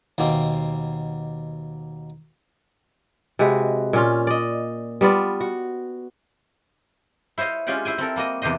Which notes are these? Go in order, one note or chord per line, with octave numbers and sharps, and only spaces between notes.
D#2 B2 A#3 C4
C3 G#3 F#4 B4
A#2 C#4 F4
D5 D#5
G3 B3 F4 D5
F#4
E4 C5 C#5 D#5 F5
G#3 C#4 F4 G4 D5 F#5
E4 C5 G5 G#5
C4 E4 A4 A#4
G3 A#3 F#4 D#5
E2 C3 G4 C5 D#5